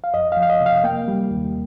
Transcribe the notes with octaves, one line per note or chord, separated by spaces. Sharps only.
F5
F2 D#5
F5
F3
F5
D#5
C3
F5
A#3 G5
G3
D#2